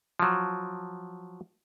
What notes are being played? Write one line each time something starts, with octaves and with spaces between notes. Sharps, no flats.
F3 F#3